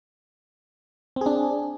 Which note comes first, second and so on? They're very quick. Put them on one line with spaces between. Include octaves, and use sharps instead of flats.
C4 G#4 D4